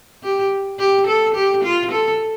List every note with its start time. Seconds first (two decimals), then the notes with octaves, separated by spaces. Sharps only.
0.23 G4
0.79 G4
1.07 A4
1.35 G4
1.64 F4
1.92 A4